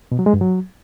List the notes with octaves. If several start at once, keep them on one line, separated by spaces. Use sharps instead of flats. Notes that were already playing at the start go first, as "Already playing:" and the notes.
B2
F#3
G#3
G2
F#3